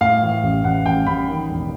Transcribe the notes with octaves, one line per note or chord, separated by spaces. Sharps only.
A2 F5
E3
A1
A1 F#5
A1 G5
A1 B5
D#3
E1